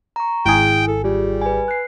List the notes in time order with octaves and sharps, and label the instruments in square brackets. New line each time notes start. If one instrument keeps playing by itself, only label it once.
[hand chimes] A#5 C#6
[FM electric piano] G#1 G#4 [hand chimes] E4 [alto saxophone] G5
[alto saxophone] A4
[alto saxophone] G3 [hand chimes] F4 G4
[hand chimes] B4 G#5
F#6 C7